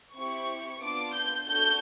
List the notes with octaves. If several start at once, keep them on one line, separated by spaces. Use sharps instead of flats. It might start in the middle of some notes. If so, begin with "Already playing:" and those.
C4 E4 G4 C#6
B3 D4 F4 D6
G6
D4 F#4 A4 G6